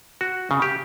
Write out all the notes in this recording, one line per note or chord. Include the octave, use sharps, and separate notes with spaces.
F#4
C#3
G4